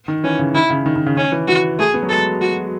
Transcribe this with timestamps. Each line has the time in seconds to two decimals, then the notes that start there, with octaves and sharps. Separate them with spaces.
0.08 D#3
0.24 E3 C#4
0.39 C#3
0.55 D#3 E4
0.70 C#3
0.86 D#3
0.96 D#3
1.06 C#3
1.17 D#3 C#4
1.32 E3
1.48 E3 F#4
1.79 A3 G#4
1.94 B3
2.03 F#3
2.09 G#3 A4
2.41 F#4